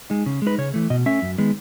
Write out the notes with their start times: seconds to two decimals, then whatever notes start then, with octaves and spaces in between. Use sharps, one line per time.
0.10 G#3 D#4
0.26 C#3
0.42 G#3 D#4 B4
0.58 C#3 C#5
0.74 E3 A3
0.90 B2 D#5
1.06 A3 C#4 E5
1.22 F#2
1.38 D#3 G#3 B3